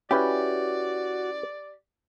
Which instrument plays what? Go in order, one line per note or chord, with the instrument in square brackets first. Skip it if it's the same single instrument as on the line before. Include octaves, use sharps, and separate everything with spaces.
[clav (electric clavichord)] C#4 E4 B4 [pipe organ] F#4 [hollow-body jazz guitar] G4 [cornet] D5